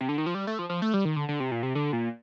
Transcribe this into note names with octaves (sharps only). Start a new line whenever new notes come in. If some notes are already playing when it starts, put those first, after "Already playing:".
C3
D3
D#3
F3
G3
A3
F3
F3
A3
G3
D#3
D3
D3
C3
A#2
C3
D3
A#2